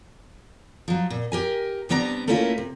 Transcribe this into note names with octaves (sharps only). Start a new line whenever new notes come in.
F3 F#3
A#2
G4 A#4 G#5
C3 G3 B3 D4 C5 A#5
A3 A#3 C#4 E4 F4 A#4
C3